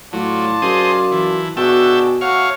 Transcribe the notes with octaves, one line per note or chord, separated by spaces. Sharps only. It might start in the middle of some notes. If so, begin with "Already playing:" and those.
A2 F#3 F4 D5 A5
F#2 G#4 C5 D#5
E3
B2 D4 F#4 G#4 A4 E5 G5
A3 F#4 C#5 F5